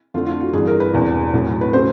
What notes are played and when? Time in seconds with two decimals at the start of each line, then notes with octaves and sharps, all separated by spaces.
0.14 F2 D3 F3 A3 F4
0.26 F4
0.40 F#4
0.53 G1 G2 E3 G#4
0.67 A#4
0.80 B4
0.94 E1 E2 C3
1.33 B1 A2 F#3 A3
1.61 B4
1.73 C#3 F#3 A3 C5